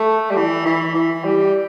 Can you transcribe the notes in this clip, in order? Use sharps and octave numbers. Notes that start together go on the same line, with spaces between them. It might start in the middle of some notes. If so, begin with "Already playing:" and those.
Already playing: A3
G3
E3
E3
E3
G3